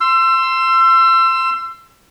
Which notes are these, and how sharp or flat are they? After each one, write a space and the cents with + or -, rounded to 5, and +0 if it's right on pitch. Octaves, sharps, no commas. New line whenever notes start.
C6 +0 E6 +30